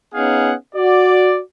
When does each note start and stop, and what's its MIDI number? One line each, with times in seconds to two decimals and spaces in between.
0.15 0.53 59
0.15 0.53 61
0.15 0.53 63
0.15 0.53 68
0.15 0.53 77
0.15 0.53 78
0.75 1.39 66
0.75 1.39 74